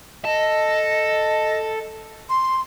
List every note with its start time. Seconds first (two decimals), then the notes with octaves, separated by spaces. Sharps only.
0.25 A4 D#5
2.29 C6